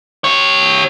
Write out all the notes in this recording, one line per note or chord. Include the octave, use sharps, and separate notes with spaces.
G4 C#5